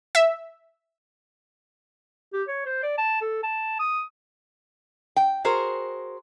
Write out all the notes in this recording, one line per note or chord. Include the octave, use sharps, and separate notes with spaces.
E5
G4
C#5
C5
D5
A5
A4
A5
D#6
G5
F#4 G#4 A#4 C5